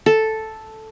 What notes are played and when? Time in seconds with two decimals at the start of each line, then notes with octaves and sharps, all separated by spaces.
0.06 A4